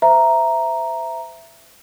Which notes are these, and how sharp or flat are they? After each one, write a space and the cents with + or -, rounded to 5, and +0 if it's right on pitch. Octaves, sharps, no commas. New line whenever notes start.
C5 -30 E5 +10 A#5 +0